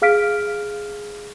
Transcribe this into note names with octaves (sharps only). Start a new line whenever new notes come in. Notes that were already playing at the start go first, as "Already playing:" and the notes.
G#4 F5 F6 B6 D7